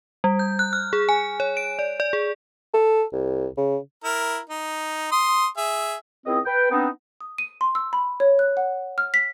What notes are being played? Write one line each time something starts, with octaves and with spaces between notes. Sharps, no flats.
G3
G6
F#6
F6
G#4
G#5
C#5
D7
D5
D5
G#4
A4
C2
C#3
E4 A#4
D#4
C6 D#6
G#4 E5
C#2 C4 E4 D#5
B4 G5
B3 C4 D4 D#4
D#6
D#7
C6
E6
B5
C#5
F#6
F#5
F6
B6